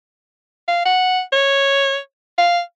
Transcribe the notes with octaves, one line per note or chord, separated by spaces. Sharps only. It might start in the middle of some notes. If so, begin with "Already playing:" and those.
F5
F#5
C#5
F5